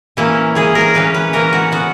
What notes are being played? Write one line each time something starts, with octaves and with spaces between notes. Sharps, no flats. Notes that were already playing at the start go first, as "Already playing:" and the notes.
E3 A#3 C#4 E4
E3 A#3 C#4 G#4
A#4
E3 A#3 C#4 B4
B4
E3 A#3 C#4 A#4
F#4
E3 B3 F#4